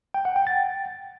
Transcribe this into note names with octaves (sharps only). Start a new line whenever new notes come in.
G5
F#5
G5
A6